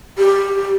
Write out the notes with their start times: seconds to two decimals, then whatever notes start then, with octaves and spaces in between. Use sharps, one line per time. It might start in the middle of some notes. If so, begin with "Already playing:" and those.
0.18 G4